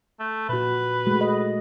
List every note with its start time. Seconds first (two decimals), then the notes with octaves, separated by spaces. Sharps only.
0.19 A3
0.49 A#2 F#4 B4
1.07 G#3 A3 F#4
1.21 D#5